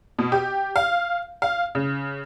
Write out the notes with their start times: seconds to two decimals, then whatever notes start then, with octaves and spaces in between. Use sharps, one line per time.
0.19 B2
0.32 G4
0.76 F5
1.42 F5
1.75 C#3